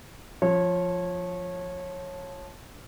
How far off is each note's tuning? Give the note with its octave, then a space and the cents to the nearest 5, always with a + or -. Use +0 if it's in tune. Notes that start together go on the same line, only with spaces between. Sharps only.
F3 +0 C#5 -20